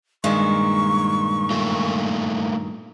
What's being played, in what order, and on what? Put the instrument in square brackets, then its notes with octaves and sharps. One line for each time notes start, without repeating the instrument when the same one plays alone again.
[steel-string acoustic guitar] G2 A#2 D#3 [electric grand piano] G#3 [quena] C#6
[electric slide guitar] A3 A#3 F4